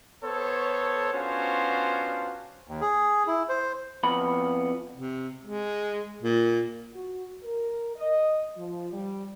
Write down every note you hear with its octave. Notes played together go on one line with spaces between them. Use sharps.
B3 A4 C5 C#5
B3 C#4 D4 F4 F#4 C5
D#2
G#4
E4
C5
F2 B3 B5
C3
G#3
A#2
F#4
A#4
D#5
F3
G3